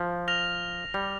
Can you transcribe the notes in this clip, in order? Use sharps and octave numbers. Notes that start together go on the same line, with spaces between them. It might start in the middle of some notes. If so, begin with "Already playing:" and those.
Already playing: F3
F6 A#6 F7
G3